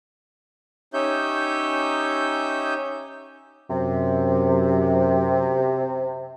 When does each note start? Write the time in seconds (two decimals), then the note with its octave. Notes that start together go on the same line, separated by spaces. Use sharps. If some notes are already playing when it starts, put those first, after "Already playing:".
0.94 C#4 D#4 G4 C#5 E5 G6
3.70 F#2 C3